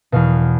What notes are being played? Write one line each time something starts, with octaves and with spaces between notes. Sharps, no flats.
E2 B2 F5